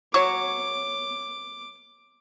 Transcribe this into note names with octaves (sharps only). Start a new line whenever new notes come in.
F#3 C#5 C#6 D6